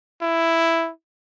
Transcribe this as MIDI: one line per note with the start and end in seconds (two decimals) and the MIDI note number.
0.22 0.90 64